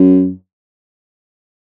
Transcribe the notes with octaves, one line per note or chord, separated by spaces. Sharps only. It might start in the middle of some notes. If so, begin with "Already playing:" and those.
Already playing: F#2